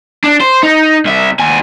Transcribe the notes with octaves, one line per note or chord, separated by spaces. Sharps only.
D4
C5
D#4
C2 E5
D#2 G#5